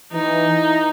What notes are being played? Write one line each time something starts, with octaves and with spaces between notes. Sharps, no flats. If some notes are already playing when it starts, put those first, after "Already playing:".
E3 D#4